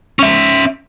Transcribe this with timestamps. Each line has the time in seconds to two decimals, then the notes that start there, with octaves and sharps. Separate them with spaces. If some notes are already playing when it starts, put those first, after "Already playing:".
0.19 C#4 E5